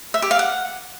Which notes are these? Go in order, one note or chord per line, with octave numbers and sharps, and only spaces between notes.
E5
G4
F5
F#5